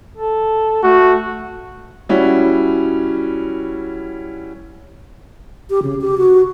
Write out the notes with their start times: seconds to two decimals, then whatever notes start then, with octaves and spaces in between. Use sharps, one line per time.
0.18 A4
0.83 A3 F#4
2.09 G3 C#4 E4 F#4
5.70 G4
5.83 C#3
6.01 G4
6.18 F#4